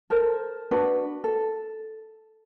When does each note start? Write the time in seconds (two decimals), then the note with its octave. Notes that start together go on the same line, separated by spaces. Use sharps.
0.10 A4 A#4 C5
0.71 D4 F#4 B4
1.24 A4